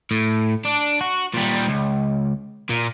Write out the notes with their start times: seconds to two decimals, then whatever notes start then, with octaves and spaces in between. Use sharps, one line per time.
0.11 A2
0.65 D4
1.01 F#4
1.34 A#2 G3
1.68 C#2
2.70 A#2